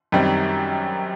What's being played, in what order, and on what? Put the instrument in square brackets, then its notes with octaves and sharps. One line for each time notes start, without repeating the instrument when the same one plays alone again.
[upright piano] F#2 D#3 G3 C4